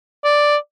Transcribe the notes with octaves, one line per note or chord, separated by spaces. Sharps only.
D5